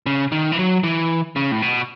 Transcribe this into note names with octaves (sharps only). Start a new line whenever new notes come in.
C#3
D#3
E3
F#3
E3
C#3
A2
B2